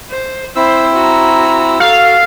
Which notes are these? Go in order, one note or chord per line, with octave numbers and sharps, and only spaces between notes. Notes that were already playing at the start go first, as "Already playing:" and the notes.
C5
C4 E4 C5 B5 E6
F#4 A#5
F#4 A4 F5